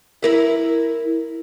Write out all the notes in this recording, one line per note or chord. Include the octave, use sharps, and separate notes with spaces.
E4 A#4 E5